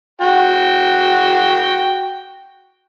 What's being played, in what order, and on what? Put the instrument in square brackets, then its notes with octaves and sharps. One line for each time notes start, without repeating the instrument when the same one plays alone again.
[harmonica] F#4 G5